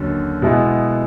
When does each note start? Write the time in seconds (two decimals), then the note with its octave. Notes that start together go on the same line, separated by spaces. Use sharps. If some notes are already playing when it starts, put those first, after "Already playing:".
Already playing: D#2 D3 F#3 C#4
0.42 B2 G#3 B3 E4